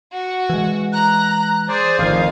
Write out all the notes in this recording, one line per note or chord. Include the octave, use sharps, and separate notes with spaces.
F#4
E3 G#3
A#5 F#6
G#4 C5 D5
A1 F2 D#3 F5